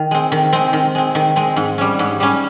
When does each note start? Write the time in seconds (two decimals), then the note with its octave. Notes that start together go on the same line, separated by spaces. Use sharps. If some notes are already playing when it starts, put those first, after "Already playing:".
Already playing: D#3
0.11 G#3 C4
0.32 D#3
0.53 G#3 C4
0.73 D#3
0.95 G#3 C4
1.15 D#3
1.36 G#3 C4
1.56 G#2
1.78 G3 C#4
1.99 G#2
2.20 G3 C#4